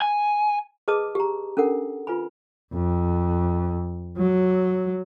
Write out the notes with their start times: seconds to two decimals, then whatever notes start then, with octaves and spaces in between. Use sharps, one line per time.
0.02 G#5
0.88 G#4 B4 D#5 A5 D6 D#6
1.15 G4 A#5
1.57 C#4 D4 A4 A#4 F#5
2.07 F4 B4 G#5 B5
2.73 F2
4.17 F#3